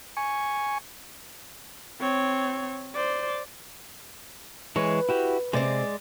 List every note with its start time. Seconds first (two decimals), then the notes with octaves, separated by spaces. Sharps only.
0.17 G#5 C#6
2.01 C4 C#5
2.95 C5 D5
4.76 E3 G#3 B4 C#5
5.09 E4 F#4 G4
5.53 C3 G#3 C4 D5